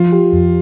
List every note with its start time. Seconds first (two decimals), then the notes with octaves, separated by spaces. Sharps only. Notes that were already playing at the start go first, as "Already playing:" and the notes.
Already playing: F3 F4
0.12 G4
0.33 F2